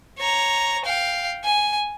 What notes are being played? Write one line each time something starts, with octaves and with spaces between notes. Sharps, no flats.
C#5 A#5
F5 G5
G#5